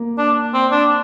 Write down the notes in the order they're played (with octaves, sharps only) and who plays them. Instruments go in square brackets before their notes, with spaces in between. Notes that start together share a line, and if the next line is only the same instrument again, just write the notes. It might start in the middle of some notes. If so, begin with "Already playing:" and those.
Already playing: [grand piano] A#3
[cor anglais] D4
C4
D4